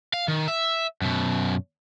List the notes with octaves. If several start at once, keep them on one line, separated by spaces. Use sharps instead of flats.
F5
D#3
E5
F#2 B2